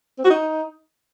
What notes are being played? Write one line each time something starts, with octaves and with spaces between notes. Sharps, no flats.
C4
F#4
D#4